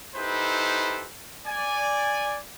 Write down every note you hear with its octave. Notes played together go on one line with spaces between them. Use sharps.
D#4 E4 G4 A4 B4 C5
D5 G#5